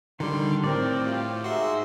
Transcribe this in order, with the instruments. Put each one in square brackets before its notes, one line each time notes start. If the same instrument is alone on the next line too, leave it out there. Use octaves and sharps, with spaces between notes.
[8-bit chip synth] D3 [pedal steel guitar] D#3 G3 [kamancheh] C6
[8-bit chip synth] A2 [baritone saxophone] C4 [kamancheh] A#4 [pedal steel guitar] D5
[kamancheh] F4 G4
[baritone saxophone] G#2 [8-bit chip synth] F#4 C6 [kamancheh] E5